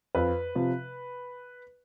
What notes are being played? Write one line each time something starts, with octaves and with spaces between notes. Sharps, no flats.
F2 B4
C3 F3